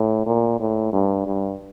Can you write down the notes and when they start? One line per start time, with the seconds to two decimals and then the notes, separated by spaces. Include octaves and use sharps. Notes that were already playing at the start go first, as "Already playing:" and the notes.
Already playing: A2
0.26 A#2
0.60 A2
0.93 G2
1.26 G2